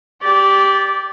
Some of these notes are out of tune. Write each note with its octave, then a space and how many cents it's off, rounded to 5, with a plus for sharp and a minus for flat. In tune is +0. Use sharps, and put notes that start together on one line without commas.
G4 +0 D5 -15